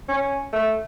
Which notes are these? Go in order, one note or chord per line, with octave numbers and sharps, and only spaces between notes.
C#4
A3